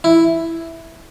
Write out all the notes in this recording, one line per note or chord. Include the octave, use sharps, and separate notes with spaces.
E4